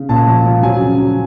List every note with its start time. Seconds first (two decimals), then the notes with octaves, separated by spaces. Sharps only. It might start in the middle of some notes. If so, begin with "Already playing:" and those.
Already playing: C#3
0.09 A#2 A5
0.27 F3
0.46 F3
0.63 F#3 G#5
0.81 C#3
0.98 F#3